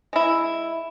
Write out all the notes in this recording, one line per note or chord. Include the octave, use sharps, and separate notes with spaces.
G#3 E4